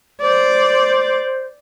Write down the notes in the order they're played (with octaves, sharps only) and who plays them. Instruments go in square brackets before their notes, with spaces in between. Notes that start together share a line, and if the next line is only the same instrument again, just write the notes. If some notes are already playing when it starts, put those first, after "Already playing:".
[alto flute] C5 [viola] D5